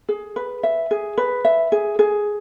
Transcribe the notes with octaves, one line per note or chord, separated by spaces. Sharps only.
G#4
B4
E5
G#4
B4
E5
G#4
G#4